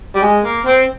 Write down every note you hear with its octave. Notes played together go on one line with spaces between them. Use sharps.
G3
G#3
A#3
C4